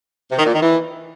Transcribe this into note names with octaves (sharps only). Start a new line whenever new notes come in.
C3
D#3
A#2
D#3
E3